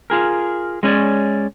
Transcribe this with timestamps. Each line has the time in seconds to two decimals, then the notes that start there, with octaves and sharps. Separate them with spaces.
0.10 F4 G#4 A#4
0.83 G#3 C#4 D#4 C#5 D5